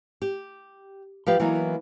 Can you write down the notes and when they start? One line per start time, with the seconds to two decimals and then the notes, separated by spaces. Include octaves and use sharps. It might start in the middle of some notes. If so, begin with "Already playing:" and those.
0.22 G4
1.27 F3 G4 B4 F5 G5
1.40 E3 F#3 A#3 B3 D#4